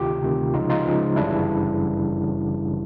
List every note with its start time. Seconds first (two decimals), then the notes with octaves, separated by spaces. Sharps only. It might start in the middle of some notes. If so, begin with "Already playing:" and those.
Already playing: D2 C3 D#3 F4 G4
0.22 D2 C3 D#3
0.54 C#2 C#3 F3 D#4 F4
0.70 D#4 F4
0.85 C#2 C#3 F3
1.16 G1 F#2 C#3 E3 G3 D4 E4